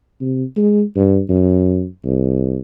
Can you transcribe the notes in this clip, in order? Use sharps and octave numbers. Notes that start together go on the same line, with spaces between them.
C3
G#3
G2
F#2
C2